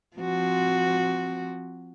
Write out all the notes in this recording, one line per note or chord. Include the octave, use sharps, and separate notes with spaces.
F3 C4 F#4